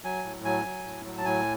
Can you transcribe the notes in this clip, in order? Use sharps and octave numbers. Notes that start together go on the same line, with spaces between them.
F#3 G#5
A2
F#3 G#5
F#3
A2
F#3
A5
A2 G#5